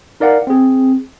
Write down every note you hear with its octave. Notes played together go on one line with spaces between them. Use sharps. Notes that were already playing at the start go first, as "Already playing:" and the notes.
D#4 A#4 D5 F5 F#5
C4 G#4